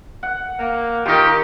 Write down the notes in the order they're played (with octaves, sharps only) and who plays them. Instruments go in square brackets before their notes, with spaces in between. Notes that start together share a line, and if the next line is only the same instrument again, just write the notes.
[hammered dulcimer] F#5
[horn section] A#3
[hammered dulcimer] D#3 D#4 A#4 [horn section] F4 G4